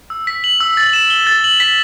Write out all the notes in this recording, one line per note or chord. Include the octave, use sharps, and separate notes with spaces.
E6
B6
F#7
E6
A6
E7
G7
A6
F#7
B6